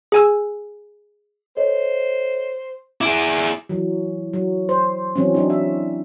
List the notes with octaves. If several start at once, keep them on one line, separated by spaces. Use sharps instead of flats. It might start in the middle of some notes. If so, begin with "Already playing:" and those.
G#4 G#5 E6
A4 C5 C#5 D#5
E4 G#4 D6 D7 E7
E3 F#3
F#3
C5
E3 F#3 C4 C#4
F#3 D4 D#4
E5